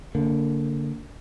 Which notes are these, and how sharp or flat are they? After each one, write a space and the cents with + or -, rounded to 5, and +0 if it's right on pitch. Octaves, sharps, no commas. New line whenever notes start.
D3 -20 A#3 -25